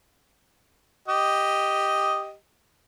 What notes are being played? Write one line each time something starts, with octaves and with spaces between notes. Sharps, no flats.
G4 D#5